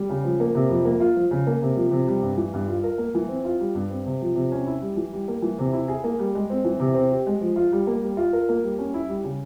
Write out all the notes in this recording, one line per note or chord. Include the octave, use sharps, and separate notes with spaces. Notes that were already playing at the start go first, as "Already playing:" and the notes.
Already playing: G3
C#3
F3
A#3
C3
F2
A#3
F4
F3
C#3
A#3
C3
F3
C3
G3
G2
E3
G2
F4
A#4
A#3
E3
C4
F4
G3
G2
C4
C3
F3
C3
C#4
E4
G3
E3
G3
A#3
E3
C3
E4
G#4
A#3
G3
G#3
C4
E3
C3
C4
G4
G#3
F3
F4
G3
A#3
G3
F4
A#4
A#3
G3
C#4
E4
G3
C#3